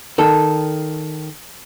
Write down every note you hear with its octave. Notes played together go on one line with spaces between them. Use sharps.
D#3 A4